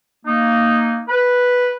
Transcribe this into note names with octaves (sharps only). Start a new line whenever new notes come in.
A#3 D#4
B4